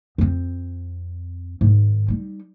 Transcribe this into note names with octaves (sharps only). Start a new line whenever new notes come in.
F2 C4
G#2 D#3
G3 D#4